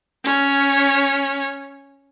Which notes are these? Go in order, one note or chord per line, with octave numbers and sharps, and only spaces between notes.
C#4 C#5